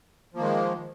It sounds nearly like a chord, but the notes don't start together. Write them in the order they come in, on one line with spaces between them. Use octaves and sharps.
F3 A#3 D#3 G#3